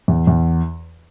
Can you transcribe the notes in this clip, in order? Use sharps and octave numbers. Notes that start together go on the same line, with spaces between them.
E2
E2